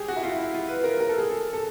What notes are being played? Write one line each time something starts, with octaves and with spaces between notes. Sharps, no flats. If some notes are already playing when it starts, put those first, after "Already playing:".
Already playing: G4 G#4
F#4
E4
F4
E4
F4
B4
A#4
A#4
A4
G#4
A4
A4